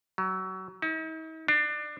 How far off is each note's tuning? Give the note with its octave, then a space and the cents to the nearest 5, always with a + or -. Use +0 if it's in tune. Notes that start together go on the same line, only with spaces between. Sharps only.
F#3 +25
D#4 +45
D4 +25